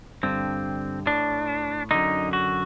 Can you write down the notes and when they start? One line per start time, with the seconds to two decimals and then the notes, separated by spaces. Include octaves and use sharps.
0.23 G2 D3 C4
1.06 A2 D4
1.91 F#2 D3 D#4
2.33 F#4